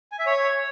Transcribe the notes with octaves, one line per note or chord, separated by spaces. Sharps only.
G#5
E5
C#5